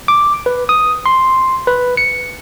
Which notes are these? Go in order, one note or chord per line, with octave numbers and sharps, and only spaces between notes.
D6
B4
D#6
C6
B4
C#7